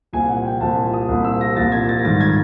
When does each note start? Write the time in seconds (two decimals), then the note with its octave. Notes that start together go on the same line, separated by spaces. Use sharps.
0.13 C2 A#2 F3 G#5
0.29 F#5
0.45 G5
0.60 C2 A#2 F3 A5
0.93 D#6
1.08 C2 A#2 F3
1.24 E6
1.41 A#6
1.56 C2 A#2 F3 A6
1.72 G#6
1.89 A6
1.99 A#6
2.04 G#2 D#3 G3 A6
2.20 G#6